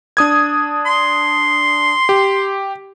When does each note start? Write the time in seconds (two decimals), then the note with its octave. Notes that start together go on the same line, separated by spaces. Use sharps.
0.17 D4 D#6 G#6
0.86 C6
2.09 G4